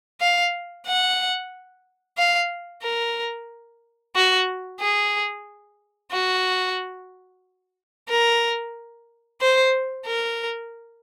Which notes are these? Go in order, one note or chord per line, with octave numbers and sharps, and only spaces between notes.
F5
F#5
F5
A#4
F#4
G#4
F#4
A#4
C5
A#4